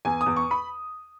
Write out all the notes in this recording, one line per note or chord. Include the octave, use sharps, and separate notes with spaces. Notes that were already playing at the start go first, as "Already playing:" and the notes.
E2 G#5
D#6
E2
C#6
B5